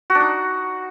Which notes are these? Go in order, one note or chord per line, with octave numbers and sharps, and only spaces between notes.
F#4
D4
D#4